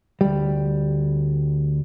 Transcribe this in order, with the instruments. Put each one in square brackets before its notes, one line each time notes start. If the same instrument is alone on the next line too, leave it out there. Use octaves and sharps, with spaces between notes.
[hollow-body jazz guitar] D2 G3